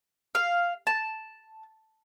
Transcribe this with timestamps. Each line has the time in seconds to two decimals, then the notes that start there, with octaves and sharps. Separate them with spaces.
0.35 F5
0.87 A5